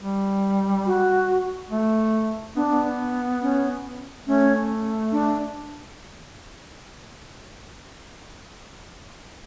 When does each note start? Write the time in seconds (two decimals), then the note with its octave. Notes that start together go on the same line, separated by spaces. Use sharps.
0.01 G3
0.86 F#4
1.71 A3
2.56 B3 D4
2.70 B3
3.42 C#4
4.27 A3 C#4
5.12 D4